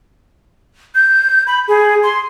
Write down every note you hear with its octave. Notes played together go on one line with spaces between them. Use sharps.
G6
B5
G#4
C6